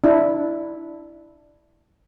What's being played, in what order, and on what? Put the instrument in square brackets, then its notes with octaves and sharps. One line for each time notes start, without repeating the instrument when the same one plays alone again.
[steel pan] D4 E4